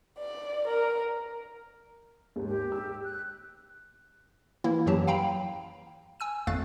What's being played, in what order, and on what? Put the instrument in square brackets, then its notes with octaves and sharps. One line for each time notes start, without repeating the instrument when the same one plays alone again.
[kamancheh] D5
A#4
[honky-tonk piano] D#2 G#2
[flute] G4
[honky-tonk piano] E6
[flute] F#6
[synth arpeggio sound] E3 A#3 E4
F#2 E3 F#3 G4 A5
F5 G5 A#5 B5
G#5 E6 D#7
G#1 F2 A3 F5 F#6 A6